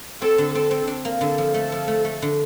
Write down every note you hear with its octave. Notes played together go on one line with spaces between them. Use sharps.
C4 A4
D3
C4 A4
C4
D4
A#3
D3 A4
F3
A3 A4
F3
A3
A3
D3